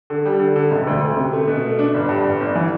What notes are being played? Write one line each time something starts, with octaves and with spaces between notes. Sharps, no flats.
D3
G3
D3
D3
E1
D2
D2
C3
A3
B2
A3
D4
G1
G2
G1
G1
E3